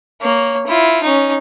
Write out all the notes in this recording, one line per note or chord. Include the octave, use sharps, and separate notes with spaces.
A#3 C#5
E4 F4
C#4 D#4